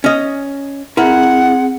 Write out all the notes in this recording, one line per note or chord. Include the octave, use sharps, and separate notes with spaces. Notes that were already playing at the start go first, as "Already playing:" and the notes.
C#4 D#5
C4 E4 G#4 A#4 F#5